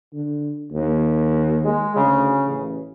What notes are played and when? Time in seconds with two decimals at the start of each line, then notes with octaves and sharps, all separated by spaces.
0.13 D3
0.72 D#2
1.65 G#3
1.96 D2 C#3
2.45 A1